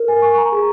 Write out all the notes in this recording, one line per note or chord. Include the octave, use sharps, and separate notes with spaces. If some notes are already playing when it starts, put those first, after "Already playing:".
Already playing: A#4
G#5
C#6
A#5
G#4